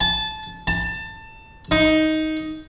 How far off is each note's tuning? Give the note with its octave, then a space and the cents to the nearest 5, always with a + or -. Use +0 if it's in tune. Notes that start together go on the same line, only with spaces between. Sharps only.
A5 -20
A5 +20
D#4 +10